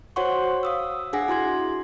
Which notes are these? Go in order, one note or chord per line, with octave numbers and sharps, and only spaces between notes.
F#4 C5 C#5 F#5 C6 C#6
F5 D#6 E6
D4 G#4 F#5 G#5 A#6
E4 F#4 C6 G#6